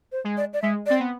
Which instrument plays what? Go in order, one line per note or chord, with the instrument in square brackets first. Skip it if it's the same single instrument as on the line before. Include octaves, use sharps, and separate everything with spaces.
[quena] C5
[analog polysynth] G#3
[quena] D5
D5
[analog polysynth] G#3 [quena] E5
[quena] D5
[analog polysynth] C4
B3